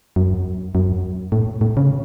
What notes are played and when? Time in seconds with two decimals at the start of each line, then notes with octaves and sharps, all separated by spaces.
0.16 F#2
0.75 F#2
1.32 A2
1.61 A2
1.77 C#3